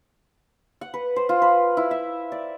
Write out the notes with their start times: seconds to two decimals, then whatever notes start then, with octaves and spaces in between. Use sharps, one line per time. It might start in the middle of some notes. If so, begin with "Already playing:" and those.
0.81 F#5
0.94 B4
1.16 C5
1.29 F4
1.42 B4
1.77 E4
1.91 E5
2.32 D5